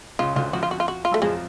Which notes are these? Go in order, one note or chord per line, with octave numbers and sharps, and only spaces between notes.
C#2 C#3 F4
D2 D3 F4
F2 F3 F#4
F4
F#4
F4
F#4
F4
F#3 A3
F2 F3 G#3